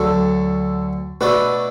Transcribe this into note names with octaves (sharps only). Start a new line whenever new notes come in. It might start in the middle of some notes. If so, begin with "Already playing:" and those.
Already playing: D2 D3 F#3 A4
B2 A3 D4 F#4 A4 B4